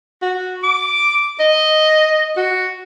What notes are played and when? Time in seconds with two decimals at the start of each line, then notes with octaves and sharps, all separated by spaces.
0.22 F#4
0.64 D6
1.40 D#5
2.37 F#4